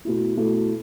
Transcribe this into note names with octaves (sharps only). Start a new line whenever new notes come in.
B2 A3 E4
B2 A3 E4